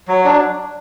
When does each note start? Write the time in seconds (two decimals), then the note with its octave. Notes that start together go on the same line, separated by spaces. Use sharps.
0.08 F#3
0.25 D4